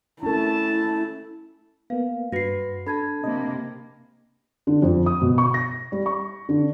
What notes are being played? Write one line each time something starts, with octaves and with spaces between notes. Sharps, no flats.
A3 C#4 E4 A5
A#3 B3 F5
G2 F#4 B4 A#6 C7
D4 A4 A5 B5 G#6
C3 A#3 D#5
D3
F2
D#6
B2
C#6
A#6
G3
C#6
D3